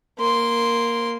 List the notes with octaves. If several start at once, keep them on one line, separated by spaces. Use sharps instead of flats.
A#3 C6